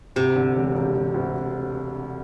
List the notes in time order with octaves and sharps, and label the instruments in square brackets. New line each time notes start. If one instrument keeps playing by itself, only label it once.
[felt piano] D2 [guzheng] C3
[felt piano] D3
E1
E1
E1
D2